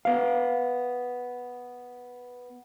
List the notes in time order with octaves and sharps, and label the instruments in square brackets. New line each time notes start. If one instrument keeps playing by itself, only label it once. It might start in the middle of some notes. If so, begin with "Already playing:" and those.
[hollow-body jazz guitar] B3 F5